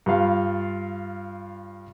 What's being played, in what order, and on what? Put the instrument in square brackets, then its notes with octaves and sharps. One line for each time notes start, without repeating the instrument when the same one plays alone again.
[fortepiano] G2 F4 F5